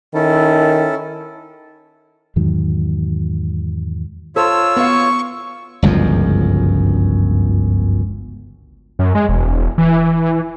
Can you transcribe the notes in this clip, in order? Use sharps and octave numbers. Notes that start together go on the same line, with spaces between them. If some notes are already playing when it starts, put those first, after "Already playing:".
D#3 C#4 E4 A4
E2 G#2 D#3 F#3
F4 A4 C5 C#5 E6
B3 F5 C#6
G1 C#2 F#2 F3
F#2
G#3
E1
E3